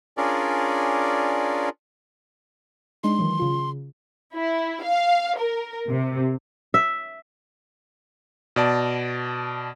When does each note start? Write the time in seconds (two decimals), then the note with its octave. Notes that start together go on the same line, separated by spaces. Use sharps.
0.17 C#4 D4 F4 G#4 A#4 D5
3.03 G#3 D4 D#4 C6
3.19 D#3 E3 F#3
3.39 C#3 F4
3.55 C#3
4.35 E4
4.83 F5
5.39 A#4
5.89 C3
6.74 E5
8.56 B2 D5 A5